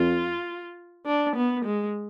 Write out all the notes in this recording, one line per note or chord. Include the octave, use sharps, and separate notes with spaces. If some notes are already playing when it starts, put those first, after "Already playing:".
Already playing: F2 F4
D4
B3
G#3